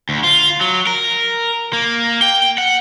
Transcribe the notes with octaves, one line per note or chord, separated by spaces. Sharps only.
D2
F4
F#3
A#4
A#3
G5
F#5